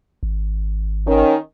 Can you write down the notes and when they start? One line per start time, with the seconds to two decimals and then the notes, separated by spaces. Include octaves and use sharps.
0.23 G#1
1.06 D#3 C#4